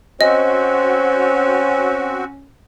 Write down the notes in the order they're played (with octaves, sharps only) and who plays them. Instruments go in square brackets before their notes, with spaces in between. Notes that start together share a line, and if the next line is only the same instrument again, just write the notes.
[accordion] C4 F#4 [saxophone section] C#4 [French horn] C5 [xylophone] D#5